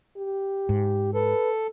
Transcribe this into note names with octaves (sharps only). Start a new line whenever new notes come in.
G4
G#2
A4 B4